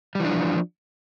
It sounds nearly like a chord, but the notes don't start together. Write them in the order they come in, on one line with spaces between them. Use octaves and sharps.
G3 E3 D4 F3